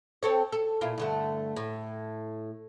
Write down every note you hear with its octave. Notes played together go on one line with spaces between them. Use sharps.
C4 A4 C#5
A4
A#2 E4 F4
G2 D3 A3
A2